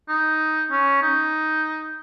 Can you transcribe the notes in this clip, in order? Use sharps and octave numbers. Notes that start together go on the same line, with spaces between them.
D#4
C#4
D#4